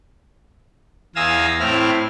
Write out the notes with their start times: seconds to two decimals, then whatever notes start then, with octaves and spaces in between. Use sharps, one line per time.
1.16 E2 F5 G#5 D#6 E6 A#6
1.60 A2 C4 E4 F6